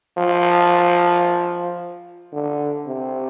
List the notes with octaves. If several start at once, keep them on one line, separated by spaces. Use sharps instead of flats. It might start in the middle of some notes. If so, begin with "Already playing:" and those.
F3
D3
C3